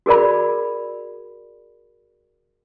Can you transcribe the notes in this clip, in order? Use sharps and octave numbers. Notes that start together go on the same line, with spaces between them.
F#4 G#4 A#4 D5 B5